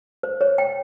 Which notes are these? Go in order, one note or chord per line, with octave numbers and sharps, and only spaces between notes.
C5
C#5
G5